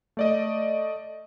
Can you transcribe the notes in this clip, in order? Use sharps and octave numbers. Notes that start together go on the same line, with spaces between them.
A3 D5 D#5